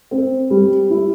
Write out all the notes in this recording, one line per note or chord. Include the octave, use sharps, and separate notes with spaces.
C4
G3
E4